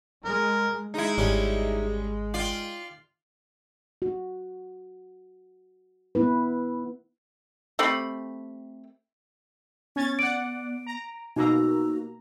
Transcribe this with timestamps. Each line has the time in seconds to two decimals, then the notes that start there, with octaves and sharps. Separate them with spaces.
0.25 G#3 A#4
0.94 G#3 D#4 E4
1.18 G#1 G3 C#4
2.34 F4 D5 G5
4.02 F#4
6.15 B3 E4 B4
7.79 A3 C4 G4 B5
9.96 B3 C#4 G#6 A6
10.19 D5 F#5 D7
10.87 A#5
11.36 B2 A#3 D#4 F#4 A#5 E6